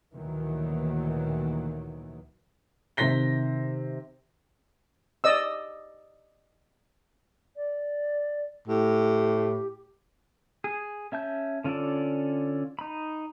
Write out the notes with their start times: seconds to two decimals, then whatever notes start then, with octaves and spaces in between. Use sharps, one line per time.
0.13 D2 A#2 D#3 E3 F#3
2.97 C3 D#3 C4 A#6 B6 G7
5.24 D5 D#5 E6
7.56 D5
8.68 A2 G4
10.64 G#4
11.12 C#4 E5 A5 G6
11.64 D3 C#4 F4 A4 D5
12.79 D#4 B5